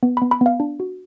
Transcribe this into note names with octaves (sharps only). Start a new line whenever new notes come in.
B3
B5
B3
B5
B3 F5
D4
F#4